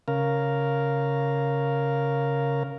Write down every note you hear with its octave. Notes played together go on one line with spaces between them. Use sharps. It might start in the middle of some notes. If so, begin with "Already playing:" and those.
C#3 A#4 F5